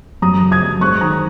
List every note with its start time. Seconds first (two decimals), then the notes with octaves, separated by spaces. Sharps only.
0.22 F#2 A#5 D#6
0.42 C#3
0.52 D#6 G#6
0.62 F#2
0.81 G#2 C#6 F#6
1.01 D#3 A#5 D#6